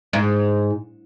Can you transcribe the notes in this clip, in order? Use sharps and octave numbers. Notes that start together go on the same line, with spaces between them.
G#2